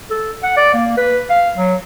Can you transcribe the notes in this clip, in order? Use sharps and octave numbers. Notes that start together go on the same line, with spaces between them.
A4
F#5
D5
A#3
B4
F5
F#3